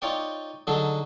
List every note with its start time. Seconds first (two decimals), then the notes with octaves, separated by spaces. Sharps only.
0.02 D#4 F4 C#5 D5 G5
0.67 D3 F#3 D#4 G#4 A4